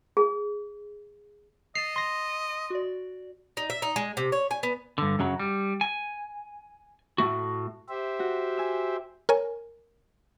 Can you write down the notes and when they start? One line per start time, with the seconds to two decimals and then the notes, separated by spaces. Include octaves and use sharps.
0.17 G#4
1.75 D#5 A6 C7 E7 F7
1.96 C6 A#6
2.70 F#4 D5
3.57 D#4
3.70 E5
3.82 D#4
3.96 G#3
4.17 C3
4.32 C#5
4.51 G#5
4.63 B3
4.98 G2 D3
5.19 F#2 C#3 F#3
5.40 G3
5.81 G#5
7.18 A2 A3 F#4
7.89 G4 C5 E5
8.19 F#4
8.57 G#5 E6
9.29 A#4 C#5 G#5